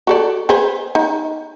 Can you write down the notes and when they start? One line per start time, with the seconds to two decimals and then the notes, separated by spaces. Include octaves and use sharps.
0.07 F#4 A4 D5
0.49 G#4 B4 C5
0.95 D#4